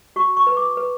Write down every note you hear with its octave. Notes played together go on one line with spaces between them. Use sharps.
F#4 C#6
C#6
B4
D6
B4